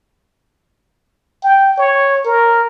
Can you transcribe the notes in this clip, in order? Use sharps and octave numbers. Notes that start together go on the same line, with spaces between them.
G5
C#5
A#4